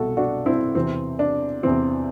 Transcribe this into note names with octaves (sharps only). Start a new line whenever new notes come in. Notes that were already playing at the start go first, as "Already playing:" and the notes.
Already playing: C2 B2 F#4 A4
D4 F#4
C4 E4
E2 C3 E3 C4
D4
E2 C3 E3 C4 E4